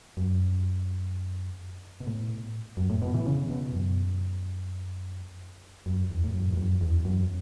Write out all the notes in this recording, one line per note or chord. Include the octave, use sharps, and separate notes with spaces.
F#2
B2
A2
F#2
A2
B2
E3
C#3
B2
F#2
F#2
E2
A2
F#2
E2
F#2
E2
F#2